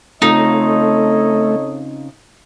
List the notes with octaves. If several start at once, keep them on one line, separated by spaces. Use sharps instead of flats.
C#3 A3 C4 D#4 F4 A4 C#5 D#5